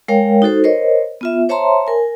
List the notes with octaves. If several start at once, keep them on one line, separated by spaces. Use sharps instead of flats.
G#3 A#4 C#5 F5 G5
D#4 F#4 A4 C5
A#4 C5 C#5 D#5
B3 F4 E5
C5 C#5 E5 A5 A#5 C6
A#4 G#5